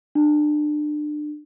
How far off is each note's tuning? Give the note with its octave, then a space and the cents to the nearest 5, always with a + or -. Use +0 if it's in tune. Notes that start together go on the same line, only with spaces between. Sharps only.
D4 +30